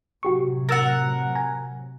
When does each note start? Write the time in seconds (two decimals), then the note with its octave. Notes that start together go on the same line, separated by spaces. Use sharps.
0.23 A2 C3 F#3 F#4 G4 C#6
0.69 A#4 F#5 E6 A6 A#6
1.35 G#5 A#5